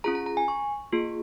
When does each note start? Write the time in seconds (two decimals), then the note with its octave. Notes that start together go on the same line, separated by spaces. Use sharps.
0.04 C#4 F4 G#4 A#5
0.15 A#5
0.26 A#5
0.37 G#5
0.48 C#6
0.92 A#3 F4 G#4